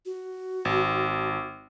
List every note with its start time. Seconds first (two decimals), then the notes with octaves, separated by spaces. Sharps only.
0.06 F#4
0.65 G#1